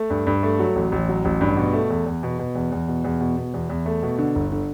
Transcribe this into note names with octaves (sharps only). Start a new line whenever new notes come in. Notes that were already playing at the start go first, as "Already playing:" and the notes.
Already playing: A3
G2
G2
A3
F#3
A1
A1
F#3
A1
G2
B2
A3
E2
E2
B2
B2
E2
E2
B2
E2
B2
B2
E2
E2
A3
B2
D3
G1
D3